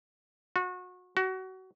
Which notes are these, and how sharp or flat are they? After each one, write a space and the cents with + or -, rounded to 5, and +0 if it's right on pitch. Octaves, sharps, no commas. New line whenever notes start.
F#4 -30
F#4 +25